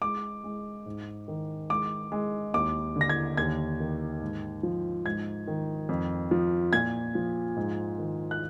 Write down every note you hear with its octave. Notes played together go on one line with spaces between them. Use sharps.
G#3 D6
G#3
G#2
D#3
G#3 D6
G#3
D#2 D6
D3
A#6
G#6
D#2 G#6
D#3
G#2
F3
G#2 G#6
D#3
F2
F3
A#2 G#6
F3
G#2
D#3
F#6